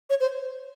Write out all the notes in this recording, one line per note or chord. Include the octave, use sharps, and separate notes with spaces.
C#5
C5